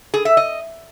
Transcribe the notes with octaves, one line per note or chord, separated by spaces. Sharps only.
G#4
E5
D#5